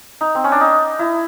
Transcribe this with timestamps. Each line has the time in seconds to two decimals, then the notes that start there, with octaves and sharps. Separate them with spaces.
0.21 D#4
0.35 C4
0.44 C#4
0.52 D4
0.61 D#4
0.99 E4